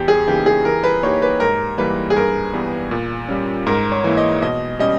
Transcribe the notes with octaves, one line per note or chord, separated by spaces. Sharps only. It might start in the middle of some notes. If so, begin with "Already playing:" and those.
Already playing: E2 G4
G#4
C#3 E3 A#3 D#4 G4
G#4
E3 A#4
B4
A#3 D#4 G4 C#5
B4
G#2 A#4
E3 G3 A#3 B4
G#4
G2 A#4
E3 G3 B3
A#2
G3 C#4
G#2 A#4
C#5
E3 A#3 E4
D#5
B2 D#5
G3 C#4 D#5